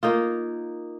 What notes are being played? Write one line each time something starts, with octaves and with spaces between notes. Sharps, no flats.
A#3 D#4 F4